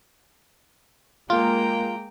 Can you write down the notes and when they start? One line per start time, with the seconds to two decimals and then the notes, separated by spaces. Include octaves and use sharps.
1.30 G#3 A#3 F4 G5 A#5